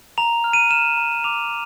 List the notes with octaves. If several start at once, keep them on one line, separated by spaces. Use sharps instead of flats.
A#5 F7
F6
D#7
F6 E7
A#5
D6 F7